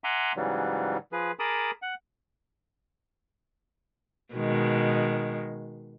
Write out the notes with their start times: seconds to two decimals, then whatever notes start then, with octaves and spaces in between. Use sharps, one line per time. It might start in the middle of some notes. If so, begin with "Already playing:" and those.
0.04 E5 F#5 G#5 A#5 C6 D6
0.36 G#2 C#3 E3 F#3 G3
1.12 F3 G#4 B4
1.39 G#4 A#4 A5 B5 D6 D#6
1.82 F#5
4.34 B2 D#3 G#3